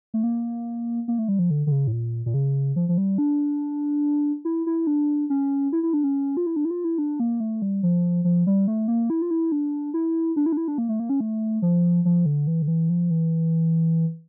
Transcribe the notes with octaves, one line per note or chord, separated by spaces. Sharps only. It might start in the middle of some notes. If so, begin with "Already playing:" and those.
A3
A#3
A#3
A3
G3
F3
D3
D3
C#3
A2
A#2
A#2
C#3
F3
F3
G3
D4
E4
E4
D4
C#4
E4
E4
D4
C#4
F4
E4
D4
E4
F4
E4
D4
A#3
A3
G3
F3
F3
G3
A3
A#3
E4
F4
E4
D4
E4
D4
E4
D4
E4
D4
A#3
A3
A#3
C#4
A3
F3
F3
D3
E3
D3
E3
F3
E3